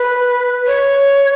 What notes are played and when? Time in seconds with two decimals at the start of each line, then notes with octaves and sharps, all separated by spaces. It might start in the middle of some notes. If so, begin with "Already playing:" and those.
Already playing: B4
0.67 C#5